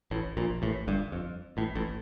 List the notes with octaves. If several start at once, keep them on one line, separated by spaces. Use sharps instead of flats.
A1 A2
A#1 A#2
A1 A2
G1 G2
F2
A1 A2
A1 A2